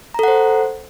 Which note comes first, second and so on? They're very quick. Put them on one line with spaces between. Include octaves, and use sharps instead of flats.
A#5 A4 F#5 C5